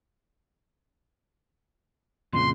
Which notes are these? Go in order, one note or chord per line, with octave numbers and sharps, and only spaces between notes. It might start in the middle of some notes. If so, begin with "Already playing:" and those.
F2 A#2 C#3 C6